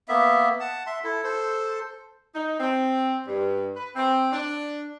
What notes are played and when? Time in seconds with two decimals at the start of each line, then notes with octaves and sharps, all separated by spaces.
0.08 A#3 B3 E5
0.60 F#5 A5
0.87 E5 C6
1.04 E4 A4
1.24 A4 C5
2.35 D#4
2.60 C4
3.27 G2
3.76 B4
3.96 C4
4.32 D4